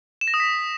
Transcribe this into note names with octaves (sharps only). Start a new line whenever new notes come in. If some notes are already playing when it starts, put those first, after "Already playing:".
E7
A#6
D#6
B6